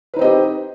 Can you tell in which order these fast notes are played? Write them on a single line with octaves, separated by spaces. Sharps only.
B4 D#4 C4 D#5 G4